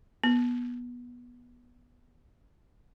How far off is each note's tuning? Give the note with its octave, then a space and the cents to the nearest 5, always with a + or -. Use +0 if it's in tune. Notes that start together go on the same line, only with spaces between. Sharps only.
B3 -15